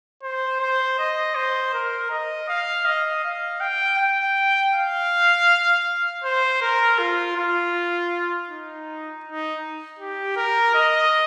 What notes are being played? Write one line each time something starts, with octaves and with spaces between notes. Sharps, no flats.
C5
C5
D#5
C5
A#4
D#5
F5
D#5
F5
G5
G5
F5
C5
A#4
F4
F4
D#4
D#4
G4
A#4
D#5